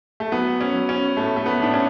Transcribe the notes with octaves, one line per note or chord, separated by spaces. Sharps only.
A3
F#3 B3
C#4
F#3
C#4
A2 A3
A3
B3
A2 D4
C#4